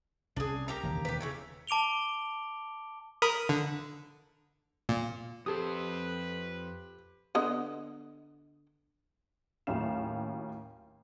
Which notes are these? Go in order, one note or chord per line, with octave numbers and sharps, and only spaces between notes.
C2 C#4 D4 G#4
A#3 G4 A#5
E1 D#2 C#3
G4 B4
C#3 E3 C#4
A5 D6 D7 F7 G7
A#4 B5 D#6
D3
A#2
F2 C4 G4 A4 B4 C5 D#6
D3 B3 D#5
D#2 A2 F#3 C#4 F5 E7